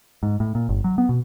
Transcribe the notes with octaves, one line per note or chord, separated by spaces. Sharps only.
G#2
A2
A#2
G1
F#3
B3
B2